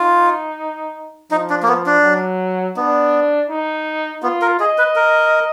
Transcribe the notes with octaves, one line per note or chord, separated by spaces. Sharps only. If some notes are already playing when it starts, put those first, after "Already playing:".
Already playing: D#4 F4
F3 D#4
D4
A#3
B3
D4
F#3
B3 D4
D#4
B3 F4
A#4
G#4 D#5
B4
A#4